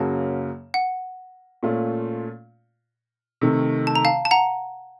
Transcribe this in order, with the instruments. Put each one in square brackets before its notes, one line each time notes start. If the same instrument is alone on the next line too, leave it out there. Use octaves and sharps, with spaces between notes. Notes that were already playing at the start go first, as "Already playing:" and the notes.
Already playing: [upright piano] F#2 C#3 F#3 A#3 [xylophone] F5 A5
[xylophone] F#5
[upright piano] A#2 A3 C#4 F4
C3 D#3 A3
[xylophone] A5
A#5
F5 A5
A5
F#5 A#5